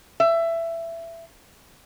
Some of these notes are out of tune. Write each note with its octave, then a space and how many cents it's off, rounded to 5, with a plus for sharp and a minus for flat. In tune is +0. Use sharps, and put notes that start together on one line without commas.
E5 +15